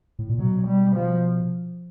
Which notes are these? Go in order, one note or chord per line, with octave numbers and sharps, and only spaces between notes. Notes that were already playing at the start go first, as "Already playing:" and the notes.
A2
A#2
B2 F#3
G3
F3